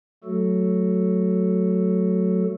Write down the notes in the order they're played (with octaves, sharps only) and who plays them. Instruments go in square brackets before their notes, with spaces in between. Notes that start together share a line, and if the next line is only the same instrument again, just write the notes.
[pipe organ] F#3 A3 F#4 A4